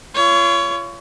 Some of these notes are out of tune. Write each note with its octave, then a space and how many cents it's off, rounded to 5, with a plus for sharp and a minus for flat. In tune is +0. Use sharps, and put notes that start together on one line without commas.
F4 -30 C#5 +20